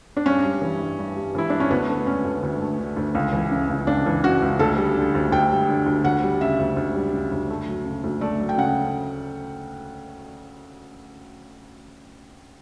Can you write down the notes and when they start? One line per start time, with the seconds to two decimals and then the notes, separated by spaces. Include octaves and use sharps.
0.17 D4
0.26 G2 C#4
0.44 G3
0.62 E3
0.80 G2
0.99 G2
1.16 G3
1.35 E3 E4
1.50 G2 D4
1.60 C#4
1.70 D2 B3
1.88 A3
2.06 D3 C#4
2.24 D2
2.43 D2
2.61 A3
2.78 D3
2.97 D2
3.15 C#2
3.33 E3
3.51 C#3
3.69 C#2
3.87 C#2 D4
4.06 E3
4.24 C#3 F#4
4.42 C#2
4.59 D2 A4
4.78 G3
4.96 D3
5.15 D2
5.32 D2 G5
5.51 G3
5.69 D3
5.86 D2
6.04 D2 F#5
6.23 G3
6.41 C#3 E5
6.59 D2
6.77 D2
6.95 G3
7.13 C#3
7.32 D2
7.50 A3
7.67 F#3
7.85 C#3
8.04 D2
8.21 A3 D5
8.40 F#3
8.49 G5
8.58 C#3 F#5